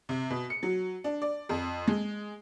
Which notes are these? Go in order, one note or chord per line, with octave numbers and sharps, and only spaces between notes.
C3
B2
C#7
F#3
D4
D5
F2
G#3